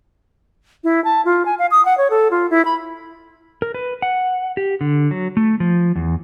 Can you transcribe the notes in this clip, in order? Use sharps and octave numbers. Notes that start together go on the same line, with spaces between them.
E4
A5
F4
G#5
F5
D#6
F#5
C#5
A4
F4
E4
B5
A#4
B4
F#5
G4
D3
F#3
A3
F3
E2